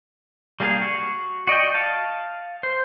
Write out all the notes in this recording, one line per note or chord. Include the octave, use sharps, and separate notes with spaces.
G3 A#3 D4 G#4 F5
F#4
F#4 D5 D#5 G5
F5 A5
C5